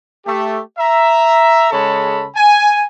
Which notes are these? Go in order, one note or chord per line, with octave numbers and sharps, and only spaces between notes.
A3 G4
E5 A#5
C#3 G#3 A4 C#5 A5 B5
G#5